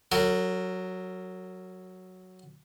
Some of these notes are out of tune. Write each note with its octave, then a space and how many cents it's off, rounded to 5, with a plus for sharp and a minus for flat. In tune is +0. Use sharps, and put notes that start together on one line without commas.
F#3 +0 A#4 -40